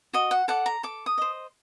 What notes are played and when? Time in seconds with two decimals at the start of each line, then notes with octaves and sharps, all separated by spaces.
0.14 F#4 D#5
0.31 F#5
0.48 A4 D5 F#5
0.66 A#5
0.83 A4 D6
1.06 D#6
1.18 C5 D#5